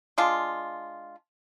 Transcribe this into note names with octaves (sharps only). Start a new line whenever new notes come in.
G#3 D4 F4